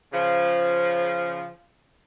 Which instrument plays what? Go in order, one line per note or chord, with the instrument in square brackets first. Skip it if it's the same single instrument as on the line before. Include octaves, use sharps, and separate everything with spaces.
[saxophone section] C#3 F3